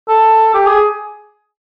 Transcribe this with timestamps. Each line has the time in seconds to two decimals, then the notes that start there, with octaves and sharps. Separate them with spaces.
0.09 A4
0.54 G4
0.66 G#4